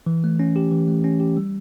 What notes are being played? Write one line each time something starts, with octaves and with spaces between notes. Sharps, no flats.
E3
A3
C#4
G4
E3
A3
C#4
G4
G3